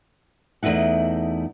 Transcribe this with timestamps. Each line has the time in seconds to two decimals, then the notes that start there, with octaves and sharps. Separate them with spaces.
0.63 E2 A3 D#4 E4 F#5